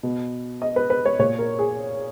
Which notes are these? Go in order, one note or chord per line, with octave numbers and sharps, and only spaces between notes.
B2
D#5
B4
B4
C#5
A#2 C#5
A#4
G#4